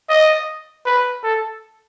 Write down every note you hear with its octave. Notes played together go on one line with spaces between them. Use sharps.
D#5
B4
A4